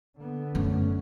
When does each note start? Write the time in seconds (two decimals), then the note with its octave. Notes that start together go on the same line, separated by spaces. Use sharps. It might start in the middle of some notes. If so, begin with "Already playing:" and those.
0.17 D3 B3
0.55 F#2 A3 C#4